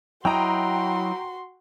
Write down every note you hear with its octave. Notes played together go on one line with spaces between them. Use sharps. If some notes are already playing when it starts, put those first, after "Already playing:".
F#3 E4 F#4 D#5 G5 A#5 C6